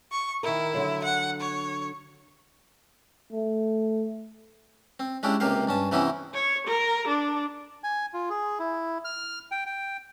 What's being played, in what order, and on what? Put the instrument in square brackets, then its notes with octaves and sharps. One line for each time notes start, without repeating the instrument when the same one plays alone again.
[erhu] C#6
[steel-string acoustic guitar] D#3 A#4 [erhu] E4
[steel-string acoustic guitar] D3 F#3
[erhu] F#5
C#5
[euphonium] A3
[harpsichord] C4
G#3 C#4 D4 E4 G4
C#2 C3 A#3 G4 F5
G2 C#4 A5
C3 E3 B3 C#4 D#4 E4
[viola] C#5
A#4
D4
[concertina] G#5
F4
G#4
E4
F6
G5
G5